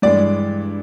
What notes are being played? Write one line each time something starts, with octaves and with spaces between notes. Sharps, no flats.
G2 E3 G#3 D5